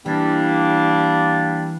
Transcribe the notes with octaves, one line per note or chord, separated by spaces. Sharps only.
E3 G3 A#3 D4